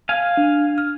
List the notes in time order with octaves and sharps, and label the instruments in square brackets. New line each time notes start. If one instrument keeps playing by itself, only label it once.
[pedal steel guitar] F5 G#5
[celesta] D4
F6